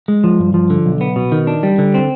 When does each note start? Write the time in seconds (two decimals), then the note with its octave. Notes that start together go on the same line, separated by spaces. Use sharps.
0.08 G#3
0.24 F3
0.39 G2
0.54 F3
0.70 D3
0.86 B1
1.01 B3
1.16 B2
1.32 D#3
1.47 D4
1.63 G3
1.78 D3
1.94 C4